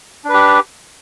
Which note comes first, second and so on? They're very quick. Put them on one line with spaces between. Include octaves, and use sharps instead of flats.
D4 B4 G4